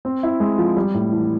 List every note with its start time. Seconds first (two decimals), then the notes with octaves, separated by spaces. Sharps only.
0.05 C4
0.23 E4
0.40 G#3
0.58 F3
0.77 G3
0.94 A2
1.12 E3